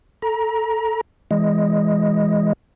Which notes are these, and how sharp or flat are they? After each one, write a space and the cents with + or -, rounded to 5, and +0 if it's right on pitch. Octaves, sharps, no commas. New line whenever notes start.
A4 +0 A#5 +25
E3 +0 G#3 +0 D#5 +0